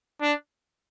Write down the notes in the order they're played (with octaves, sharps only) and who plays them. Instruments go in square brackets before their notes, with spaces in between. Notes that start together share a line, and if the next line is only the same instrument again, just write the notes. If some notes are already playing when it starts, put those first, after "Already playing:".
[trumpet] D4